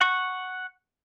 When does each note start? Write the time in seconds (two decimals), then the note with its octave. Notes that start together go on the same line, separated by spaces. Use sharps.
0.01 F#5 C#6